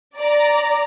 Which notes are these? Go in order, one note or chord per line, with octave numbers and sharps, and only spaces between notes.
D5 A#5